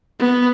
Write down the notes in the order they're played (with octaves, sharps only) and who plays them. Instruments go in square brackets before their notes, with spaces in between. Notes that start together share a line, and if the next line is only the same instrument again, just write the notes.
[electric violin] B3